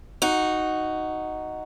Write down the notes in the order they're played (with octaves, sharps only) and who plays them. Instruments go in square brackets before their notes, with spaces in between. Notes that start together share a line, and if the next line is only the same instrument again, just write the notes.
[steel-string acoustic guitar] D#4 F#4